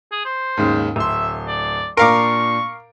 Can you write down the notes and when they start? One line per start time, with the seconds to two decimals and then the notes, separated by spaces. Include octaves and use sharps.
0.12 G#4
0.25 C5
0.57 D#2 G#2 C#3
0.96 D1 E5 C6
1.47 D5
1.97 A#2 D4 A#4 F5 C#6 D6 D7